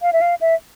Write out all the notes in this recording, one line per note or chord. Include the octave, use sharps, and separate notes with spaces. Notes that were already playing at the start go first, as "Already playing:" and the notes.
F5
E5
F5
E5